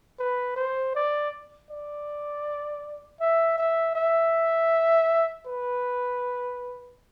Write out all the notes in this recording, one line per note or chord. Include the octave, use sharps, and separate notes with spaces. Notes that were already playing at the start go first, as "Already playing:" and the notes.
B4
C5
D5
D5
E5
E5
E5
B4